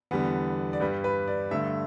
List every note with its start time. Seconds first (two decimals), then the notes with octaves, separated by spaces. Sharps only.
0.11 E2 D3 G3 B3
0.73 D5
0.80 G2 G3 B4
1.04 B4
1.28 D5
1.51 G2 D3 A3 E5